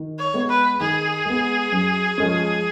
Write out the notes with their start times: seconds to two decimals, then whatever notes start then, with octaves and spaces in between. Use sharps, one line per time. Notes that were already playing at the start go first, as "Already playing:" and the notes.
Already playing: D#3
0.19 C#5
0.34 G#3 B3
0.49 B4
0.80 D#3 G#4
1.25 G#3 B3
1.72 F#2
2.18 F3 G#3 C#4